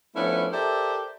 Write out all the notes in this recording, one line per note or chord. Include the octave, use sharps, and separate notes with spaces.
F3 A3 B3 C#4 D4 E4
G4 A4 A#4 C5 D5 E5